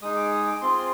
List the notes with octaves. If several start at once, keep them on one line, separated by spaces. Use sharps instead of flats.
G#3 D#4 G#4 D#6
D6
D#6
D6
C4 F4 G#4 C6